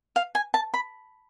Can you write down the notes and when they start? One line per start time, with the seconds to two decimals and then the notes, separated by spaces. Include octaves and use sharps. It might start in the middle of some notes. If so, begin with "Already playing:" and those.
0.16 F5
0.35 G#5
0.54 A5
0.74 B5